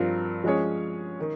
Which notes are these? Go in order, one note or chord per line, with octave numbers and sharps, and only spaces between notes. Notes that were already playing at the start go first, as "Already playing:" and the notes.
Already playing: G2 F3 C4 F4 A#4
F3 G#3 C#4 G#4 C#5
D#3